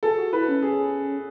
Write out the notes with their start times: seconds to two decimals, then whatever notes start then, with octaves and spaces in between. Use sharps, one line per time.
0.03 G#4 A4
0.18 F#4
0.33 E4 B4
0.48 C#4
0.62 G#4